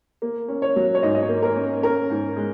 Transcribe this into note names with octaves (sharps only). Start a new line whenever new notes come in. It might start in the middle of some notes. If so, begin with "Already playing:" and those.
A#3
C#4
C#5
F#3
C#5
G#2 D#5
D#5
C#5
A#3
A#4
C#4
C#4 A#4
G#2
G#3